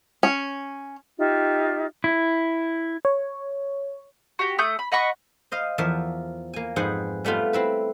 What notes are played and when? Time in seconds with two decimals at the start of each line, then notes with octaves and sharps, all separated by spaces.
0.23 C#4
1.18 D#4 F4 G4 E5
2.04 E4
3.05 C#5
4.39 F#4 G4
4.59 A3 D#6 G6
4.79 B5
4.92 D#5 F#5 B5 C#6
5.51 C5 D#5 F5
5.78 E2 F3 A#4 E5 A5
6.53 A#3 G#5
6.76 F2 G#2 B3 G#4 C5 F#5
7.25 G3 A3 B3 F4
7.53 C4 E4 B4